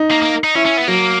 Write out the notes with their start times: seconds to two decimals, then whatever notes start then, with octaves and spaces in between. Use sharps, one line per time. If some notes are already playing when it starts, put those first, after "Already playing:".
Already playing: D#4
0.11 A#3
0.22 A#3
0.44 D#4
0.55 C#4 E4
0.65 C#4
0.77 B3
0.88 F#3 A#3